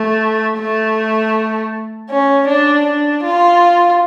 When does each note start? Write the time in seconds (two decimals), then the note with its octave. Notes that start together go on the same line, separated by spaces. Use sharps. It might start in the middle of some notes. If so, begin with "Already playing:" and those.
Already playing: A3
0.59 A3
2.10 C#4
2.48 D4
2.86 D4
3.24 F4